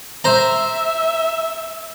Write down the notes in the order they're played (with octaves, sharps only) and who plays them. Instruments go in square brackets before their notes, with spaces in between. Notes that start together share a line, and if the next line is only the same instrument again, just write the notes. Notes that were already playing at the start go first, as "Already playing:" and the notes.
[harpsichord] C5 A#5 [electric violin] E5